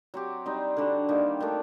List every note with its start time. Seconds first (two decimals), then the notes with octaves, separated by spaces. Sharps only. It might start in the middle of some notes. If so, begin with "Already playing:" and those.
0.14 F#3 C4 G4
0.46 G3 C4 D#4
0.77 D3 G3 D4 F#4
1.09 D#3 G3 A#3 D#4
1.40 D#3 F#3 A3 D4